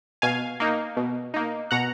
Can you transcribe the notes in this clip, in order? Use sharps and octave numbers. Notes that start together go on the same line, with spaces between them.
B2 F5 G#5
A#3 D#4
B2
A#3 D#4
B2 F#5 A#5